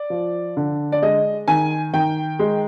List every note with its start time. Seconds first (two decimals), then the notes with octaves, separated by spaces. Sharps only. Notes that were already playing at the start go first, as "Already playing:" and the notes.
Already playing: D5
0.10 F3
0.57 D3
0.92 D5
1.02 G#3 D#5
1.48 D#3 G#5
1.93 D#3 G5
2.39 G#3